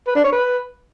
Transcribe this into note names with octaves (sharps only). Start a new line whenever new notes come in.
B4
D4
C#5
B4